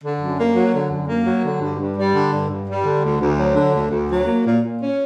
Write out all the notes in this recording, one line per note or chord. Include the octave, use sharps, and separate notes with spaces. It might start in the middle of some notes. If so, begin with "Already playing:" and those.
D3
F#2
A#3
F#3
D3
F#2
A#3
F#3
D3
G2
G2
G3
D3
G2
G2
G3
D3
D2
D2
F#3
D3
D2
D2
F#3
A#3
A#2
A#2
C#4